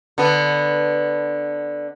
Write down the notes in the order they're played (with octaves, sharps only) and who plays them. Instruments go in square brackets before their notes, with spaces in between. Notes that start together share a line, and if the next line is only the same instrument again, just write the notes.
[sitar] D3 B3